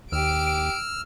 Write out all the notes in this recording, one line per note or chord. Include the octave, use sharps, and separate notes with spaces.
D#2 G4 E6 F6 D7